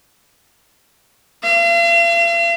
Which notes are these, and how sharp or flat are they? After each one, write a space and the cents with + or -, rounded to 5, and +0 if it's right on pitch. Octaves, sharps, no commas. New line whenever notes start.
F5 -45